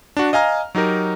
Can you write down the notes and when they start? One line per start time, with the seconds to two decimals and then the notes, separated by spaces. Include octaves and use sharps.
0.17 D4 F#4
0.33 D#5 F5 G#5 A#5 F6
0.75 F#3 D#4 G4 A#4